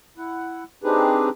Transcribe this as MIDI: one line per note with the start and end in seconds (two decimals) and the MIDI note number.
0.18 0.64 64
0.18 0.64 78
0.84 1.29 60
0.84 1.29 62
0.84 1.29 63
0.84 1.29 67
0.84 1.29 68
0.84 1.29 71